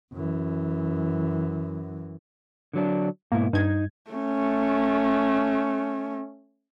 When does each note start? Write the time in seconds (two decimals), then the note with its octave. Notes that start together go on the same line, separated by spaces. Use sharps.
0.13 F#2 E3
2.73 D3 F#3 D4
3.32 G#2 B2 A#3 E4
3.53 G2 D#4 G#6
4.11 A3 C#4